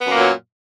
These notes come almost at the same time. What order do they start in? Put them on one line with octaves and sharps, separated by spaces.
B3 F#2 A#3 A#2 F#3